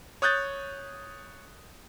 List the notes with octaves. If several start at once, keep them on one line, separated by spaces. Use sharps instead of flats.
C#5 D#6 F#6 G6 A6